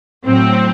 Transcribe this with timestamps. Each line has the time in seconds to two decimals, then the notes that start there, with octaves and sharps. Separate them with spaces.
0.25 A2 F#3 C4